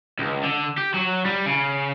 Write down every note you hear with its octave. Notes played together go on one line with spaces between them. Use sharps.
C#2
D3
G4
F#3
G3
C#3